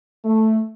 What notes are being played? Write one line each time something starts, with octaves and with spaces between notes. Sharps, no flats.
A3